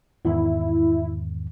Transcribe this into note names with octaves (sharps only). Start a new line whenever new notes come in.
E2 G#2 D#3 E4